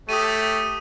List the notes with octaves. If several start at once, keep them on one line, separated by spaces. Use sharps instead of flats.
A3 G4 C#5 D#6 D#7